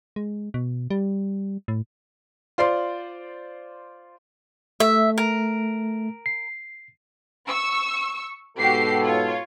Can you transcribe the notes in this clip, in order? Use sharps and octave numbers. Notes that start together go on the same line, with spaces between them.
G#3
B2
G3
A2
F4 C5 D5 C6
A3 E5
A#4
C7
C#6 E6
G#2 B2 F#4 G4 A4 C7
F4 C#5